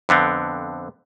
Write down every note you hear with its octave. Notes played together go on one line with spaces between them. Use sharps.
F2 D3 B3 C4